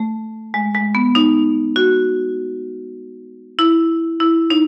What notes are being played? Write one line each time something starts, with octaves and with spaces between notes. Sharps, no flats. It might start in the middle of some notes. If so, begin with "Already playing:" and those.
Already playing: A3
G#3
G#3
B3
D#4
F#4
E4
E4
D#4